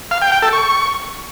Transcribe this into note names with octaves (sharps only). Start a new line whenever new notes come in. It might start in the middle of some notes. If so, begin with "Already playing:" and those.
F5
G5
G5
A4
C#6